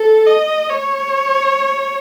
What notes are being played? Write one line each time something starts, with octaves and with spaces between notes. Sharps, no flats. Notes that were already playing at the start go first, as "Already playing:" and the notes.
Already playing: A4
D#5
C#5